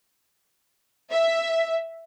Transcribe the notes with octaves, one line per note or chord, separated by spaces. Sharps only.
E5